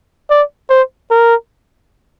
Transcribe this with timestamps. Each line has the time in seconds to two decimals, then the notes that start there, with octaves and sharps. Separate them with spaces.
0.30 D5
0.69 C5
1.10 A#4